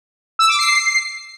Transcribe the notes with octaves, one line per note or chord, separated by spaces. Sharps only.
E6
D6
C7